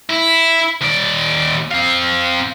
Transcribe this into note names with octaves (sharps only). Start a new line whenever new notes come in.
E4
D#2 D5
C4 F5